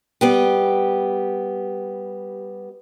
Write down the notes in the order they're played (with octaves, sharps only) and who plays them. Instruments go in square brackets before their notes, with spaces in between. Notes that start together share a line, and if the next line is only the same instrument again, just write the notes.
[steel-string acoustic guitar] G3 B3 G4